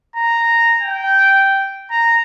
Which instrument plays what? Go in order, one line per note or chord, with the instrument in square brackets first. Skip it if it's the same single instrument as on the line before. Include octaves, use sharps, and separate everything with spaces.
[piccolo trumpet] A#5
G5
A#5